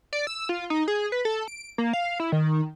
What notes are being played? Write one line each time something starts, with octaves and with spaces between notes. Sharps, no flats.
D5
E6
F4
D#4
G#4
B4
A4
D7
A#3
F5
E4
D#3